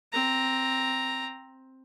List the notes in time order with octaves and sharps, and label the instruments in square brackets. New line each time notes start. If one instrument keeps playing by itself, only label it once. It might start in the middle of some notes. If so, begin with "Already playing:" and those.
[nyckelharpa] C4 A#5